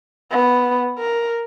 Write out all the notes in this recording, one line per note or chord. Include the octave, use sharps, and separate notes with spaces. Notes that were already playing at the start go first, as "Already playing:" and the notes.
B3
A#4